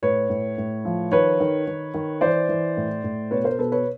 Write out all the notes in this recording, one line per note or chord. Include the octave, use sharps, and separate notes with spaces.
A2 B4 C#5
A2
A2
F3
D#3 B4 C#5
D#3
D#3
D#3
E3 C5 D5
E3
A2
A2
B2 B4 C#5
A#4 C5
B2 A4 B4
B4 C#5